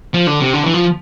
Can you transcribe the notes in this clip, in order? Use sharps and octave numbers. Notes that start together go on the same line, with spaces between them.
F3
D3
C3
D3
E3
F3